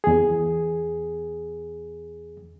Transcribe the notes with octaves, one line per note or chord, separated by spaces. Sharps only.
E2 G#4